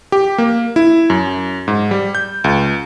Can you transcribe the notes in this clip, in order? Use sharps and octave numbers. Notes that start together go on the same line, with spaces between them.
G4
A#3
E4
F#2
G#2
G3
G6
C#2